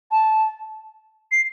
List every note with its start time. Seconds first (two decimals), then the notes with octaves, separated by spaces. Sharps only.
0.11 A5
1.32 C7